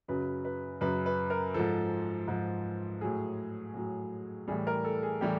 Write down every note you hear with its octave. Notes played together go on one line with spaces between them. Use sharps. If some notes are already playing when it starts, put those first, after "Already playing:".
F#2 C#3 F#3 B4
B4
F#2 C#3 F#3 B4
B4
A#4
G#2 F3 A4
G#2 F3
A2 F#3 G#4
A2 F#3
A2 E3 G3 G#4
A#4
A4
G#4
A2 E3 G3 G4